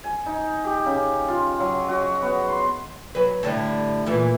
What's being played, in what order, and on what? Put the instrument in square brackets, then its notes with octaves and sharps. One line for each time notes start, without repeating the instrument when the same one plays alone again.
[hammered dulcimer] G#5
D#4
G4
C#3
F4
F#3
F#4
B3
C6
[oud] F#3 B4
A2 D3 G3
A#2 E3 A3